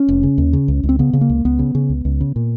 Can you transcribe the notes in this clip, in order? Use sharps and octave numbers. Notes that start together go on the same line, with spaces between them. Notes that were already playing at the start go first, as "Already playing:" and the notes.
Already playing: C#4
F1
C#3
D#2
C#3
C#2
C#2
C4
C#3 B3
C#3
A#3
C#2
C#2 B3
C#3
C#3
C#2
C#2
C#3
A#2